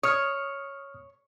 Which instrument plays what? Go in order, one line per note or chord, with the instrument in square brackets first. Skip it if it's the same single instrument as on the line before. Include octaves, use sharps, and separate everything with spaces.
[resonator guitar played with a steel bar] C#5 [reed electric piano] D#6 F6